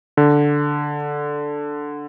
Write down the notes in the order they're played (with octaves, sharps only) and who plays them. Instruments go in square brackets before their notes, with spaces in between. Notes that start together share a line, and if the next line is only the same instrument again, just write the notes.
[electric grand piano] D3